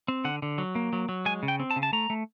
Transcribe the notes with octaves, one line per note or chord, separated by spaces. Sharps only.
C4
D3 F#5
D3
F#3
A#3
F#3
F#3
G#3 G#5
C#3
G5
C4
A5
C#3
A5
A3 A#5
A3